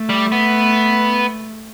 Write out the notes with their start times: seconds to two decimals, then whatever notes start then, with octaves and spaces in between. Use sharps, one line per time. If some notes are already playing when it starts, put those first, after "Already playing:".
Already playing: A3
0.09 G3
0.32 B3